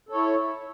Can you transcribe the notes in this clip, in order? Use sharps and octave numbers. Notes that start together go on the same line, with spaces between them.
E4 A4 C#5